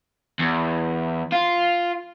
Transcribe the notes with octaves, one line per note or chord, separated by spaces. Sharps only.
E2
F4